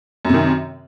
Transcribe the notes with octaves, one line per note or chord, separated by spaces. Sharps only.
F#2 C3 D#3